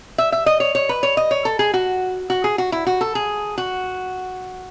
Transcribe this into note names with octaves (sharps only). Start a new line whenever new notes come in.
E5
E5
D#5
C#5
C#5
B4
C#5
D#5
C#5
A4
G#4
F#4
F#4
G#4
F#4
E4
F#4
A4
G#4
F#4